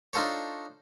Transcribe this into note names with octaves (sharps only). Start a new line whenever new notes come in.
D4 D#4 F4 A4 C5 C#5